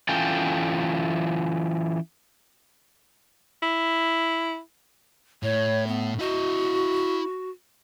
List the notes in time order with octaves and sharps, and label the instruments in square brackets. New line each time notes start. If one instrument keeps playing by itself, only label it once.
[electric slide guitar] E3 C#4 F4 A4 G5
[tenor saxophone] E4
[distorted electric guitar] A2 [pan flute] C#5
[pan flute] B3
[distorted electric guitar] E4 D#5 [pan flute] F#4